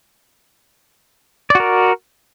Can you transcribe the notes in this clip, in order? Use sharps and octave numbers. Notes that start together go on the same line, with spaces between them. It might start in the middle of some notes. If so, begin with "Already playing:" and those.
F#4 A#4 D5